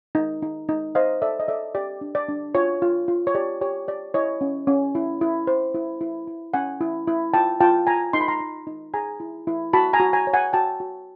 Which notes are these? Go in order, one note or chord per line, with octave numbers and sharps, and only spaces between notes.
D#4
D#4
D#4
C5 D#5 F5
A4 D5 E5
D#5
A4 D5 E5
G4 D5
D4
D5
D4
F4 C#5
F4
F4
C#5
G4 D5
G4 C#5
G4 D5
E4 C#5 D#5
C#4
C#4
E4
E4
C5
E4
E4
E4
C#4 F#5 G#5
E4
E4
F4 G5 A5
F4 G5 A5
F4 G#5 A#5
D#4 C6
B5
A#5 C6
D#4
D#4
G#4 G#5 A#5
E4
E4
F#4 A5 B5
G#5 A#5
F#4
G#5 A#5
C#5
F#5 G#5
F#4 G5 A5
F#4